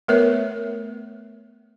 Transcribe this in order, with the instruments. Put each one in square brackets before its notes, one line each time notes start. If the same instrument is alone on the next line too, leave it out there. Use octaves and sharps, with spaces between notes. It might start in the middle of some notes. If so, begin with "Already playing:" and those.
[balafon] A3 B3 A#4 B4 C#5 E5